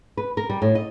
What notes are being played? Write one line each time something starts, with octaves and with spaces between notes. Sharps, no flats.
B4
A#4
G3
A2
D#5